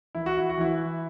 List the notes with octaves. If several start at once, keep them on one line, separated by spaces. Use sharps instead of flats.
E3 E4
F#4
E4
F#4
E3 E4